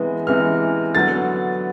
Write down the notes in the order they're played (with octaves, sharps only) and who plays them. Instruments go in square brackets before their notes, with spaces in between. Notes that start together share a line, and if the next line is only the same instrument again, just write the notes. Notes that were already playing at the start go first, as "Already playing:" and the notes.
Already playing: [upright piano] C3 E3 G#3 B3
C3 E3 G#3 B3 F6
D3 F#3 B3 A6